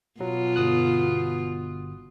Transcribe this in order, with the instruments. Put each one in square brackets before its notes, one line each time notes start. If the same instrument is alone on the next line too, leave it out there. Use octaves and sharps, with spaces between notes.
[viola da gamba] B2 F4 [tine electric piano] F#3
[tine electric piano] G1 D#6 F#6